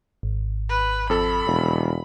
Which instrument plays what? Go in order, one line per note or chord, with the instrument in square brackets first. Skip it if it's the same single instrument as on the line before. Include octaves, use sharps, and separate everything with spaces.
[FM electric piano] G#1
[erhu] B4
[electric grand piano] F2 A4 [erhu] B5
[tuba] E1